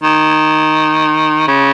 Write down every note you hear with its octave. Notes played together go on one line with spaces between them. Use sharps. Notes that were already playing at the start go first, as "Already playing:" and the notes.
D#3
C#3